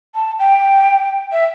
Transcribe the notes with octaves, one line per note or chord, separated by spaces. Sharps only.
A5
G5
E5